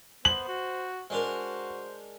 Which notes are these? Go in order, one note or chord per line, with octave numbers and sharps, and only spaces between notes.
B3 C5 F#7
F#4
G#3 D4 F#4 A#4 C5